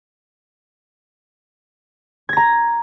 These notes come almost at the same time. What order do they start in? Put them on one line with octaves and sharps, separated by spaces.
G#6 A#6 A#5